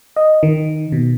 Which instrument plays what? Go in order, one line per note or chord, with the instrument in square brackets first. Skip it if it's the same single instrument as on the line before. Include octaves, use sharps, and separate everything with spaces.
[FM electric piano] D#5
D#3
B2